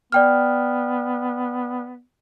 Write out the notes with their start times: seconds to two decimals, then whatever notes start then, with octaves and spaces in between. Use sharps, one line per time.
0.12 B3 D5 G5 F6